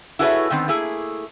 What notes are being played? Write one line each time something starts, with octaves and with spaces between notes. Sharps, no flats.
E4 F#4 G#4 A4 B4 C#5
D3 D#3 B3 C4
A3 A#3 E4 G#4